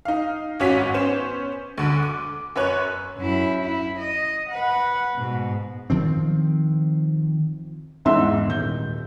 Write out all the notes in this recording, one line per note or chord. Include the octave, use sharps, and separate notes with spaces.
D#4 F5
G#1 G#2 C#4 F#4 B6 D#7
B3 C#4 C5 E7
D2 D3 D#7
D6
F#2 B4 C#5 F#6
F#2 E4
E4
D#5
B4 F#5
G#2 B2
D#3 F3 C4
E2 G#2 E4 E5 C6 E6
D#1 G6